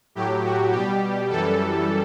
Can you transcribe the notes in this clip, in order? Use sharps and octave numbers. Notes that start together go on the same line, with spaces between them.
A2 F#3 G4
F#4
B2 G3 G4
F#2 E3 G3 A4